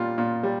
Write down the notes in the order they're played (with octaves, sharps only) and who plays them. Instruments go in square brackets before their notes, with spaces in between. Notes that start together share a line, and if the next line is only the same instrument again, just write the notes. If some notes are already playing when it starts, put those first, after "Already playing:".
Already playing: [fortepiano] A#2 G3 F4
A#2
G3